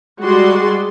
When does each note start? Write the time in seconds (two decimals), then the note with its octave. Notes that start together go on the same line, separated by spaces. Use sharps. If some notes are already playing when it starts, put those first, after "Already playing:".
0.22 G3 G#3 F#4 G#4 D5 C6